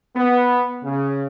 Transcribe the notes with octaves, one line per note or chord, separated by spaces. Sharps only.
B3
C#3